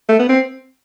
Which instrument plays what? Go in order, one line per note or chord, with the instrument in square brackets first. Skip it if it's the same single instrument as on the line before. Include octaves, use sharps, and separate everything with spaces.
[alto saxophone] A3
B3
C4